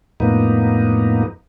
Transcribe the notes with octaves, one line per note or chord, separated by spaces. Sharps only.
F2 A2 A#3 B3 D#4